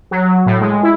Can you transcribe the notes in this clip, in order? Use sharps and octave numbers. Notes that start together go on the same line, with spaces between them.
F#3
A2
G#3
E4